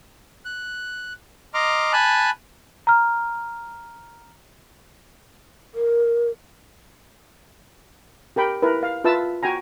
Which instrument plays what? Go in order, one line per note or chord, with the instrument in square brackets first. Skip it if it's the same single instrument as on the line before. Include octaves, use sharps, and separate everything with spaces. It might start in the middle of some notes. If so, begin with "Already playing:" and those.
[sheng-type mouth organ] F#6
D#5 A#5 C6 D6 F6
G#5 A5 B5 F#6
[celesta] A#5 F6
[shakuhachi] A#4
[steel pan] G4 A#4 G5 B5
E4 A#4 B4
F5
F4 B4 E5 A5 E6
F#4 G5 G#5 A#5